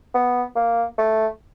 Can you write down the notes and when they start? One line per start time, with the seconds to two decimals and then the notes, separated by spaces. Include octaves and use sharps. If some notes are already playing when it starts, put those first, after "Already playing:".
0.14 B3
0.56 A#3
0.98 A3